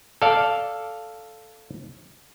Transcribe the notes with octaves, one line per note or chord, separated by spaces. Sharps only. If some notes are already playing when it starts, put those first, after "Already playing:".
A4 D5 F5